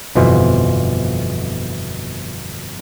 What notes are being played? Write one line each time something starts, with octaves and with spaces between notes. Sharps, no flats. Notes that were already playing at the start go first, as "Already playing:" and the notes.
G1 F2 B2 E3 F4 C5